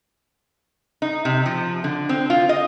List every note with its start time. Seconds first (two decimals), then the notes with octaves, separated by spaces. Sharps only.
1.02 D#4
1.25 C3
1.46 F3
1.84 D3
2.09 C4
2.30 F4
2.49 D#5